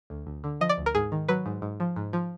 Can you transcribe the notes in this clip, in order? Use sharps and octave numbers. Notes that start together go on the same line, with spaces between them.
D2
D2
D3
F3 D#5
D5
D2
A#4
G#2 G#4
D#3
F#3 B4
G#2
G#2
F3
G#2
F3